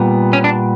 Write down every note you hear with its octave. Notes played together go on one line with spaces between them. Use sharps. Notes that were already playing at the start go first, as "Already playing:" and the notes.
Already playing: A#2 G3 B3
C#4
D4